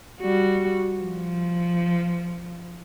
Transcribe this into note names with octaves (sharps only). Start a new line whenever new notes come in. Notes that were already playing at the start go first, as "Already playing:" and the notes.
G3 F#4
F3